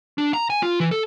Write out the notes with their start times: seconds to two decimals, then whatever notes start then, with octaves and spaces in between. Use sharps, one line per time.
0.18 D4
0.34 A#5
0.50 G#5
0.63 F4
0.80 E3
0.91 A4